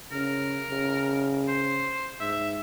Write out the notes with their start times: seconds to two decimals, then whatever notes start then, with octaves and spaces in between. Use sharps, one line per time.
0.12 C#3 A#4
0.70 C#3
1.48 C5
2.20 G#2 E5